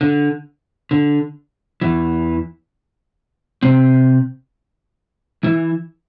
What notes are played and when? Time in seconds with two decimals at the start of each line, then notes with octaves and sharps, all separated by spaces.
0.01 D3
0.91 D3
1.81 E2 E3
3.63 C3 C4
5.43 E3 E4